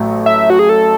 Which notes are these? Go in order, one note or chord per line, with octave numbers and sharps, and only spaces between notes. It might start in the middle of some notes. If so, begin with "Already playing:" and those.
Already playing: A1 A2 F#3 A3
E5
F#4
G#4
A4